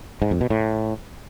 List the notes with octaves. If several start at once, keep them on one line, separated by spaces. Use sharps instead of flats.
G#2
F2
B2
A2